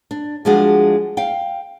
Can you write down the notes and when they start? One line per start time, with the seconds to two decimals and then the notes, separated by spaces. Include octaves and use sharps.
0.11 D4
0.45 F3 G3 G#3 D4 F#4 G#4
1.17 F5 G5